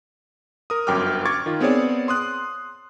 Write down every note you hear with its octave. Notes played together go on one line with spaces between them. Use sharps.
A#4 D#6
G1 F#2 G5 D6 F6
C#6 D6 G#6 A6
D#3 F4
B3 C4 G#4 C#5 D5
C6 D#6 F#6